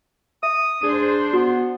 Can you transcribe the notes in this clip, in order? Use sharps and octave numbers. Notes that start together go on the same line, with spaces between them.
E5 D#6
D4 G#4 C5
B3 F#4